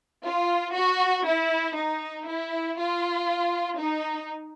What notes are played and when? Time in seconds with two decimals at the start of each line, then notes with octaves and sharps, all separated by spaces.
0.25 F4
0.75 F#4
1.27 E4
1.77 D#4
2.28 E4
2.78 F4
3.80 D#4